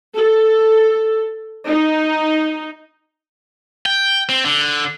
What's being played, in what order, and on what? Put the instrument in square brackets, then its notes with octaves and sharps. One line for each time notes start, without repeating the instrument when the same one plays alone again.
[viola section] A4
D#4
[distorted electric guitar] G5
C4
D3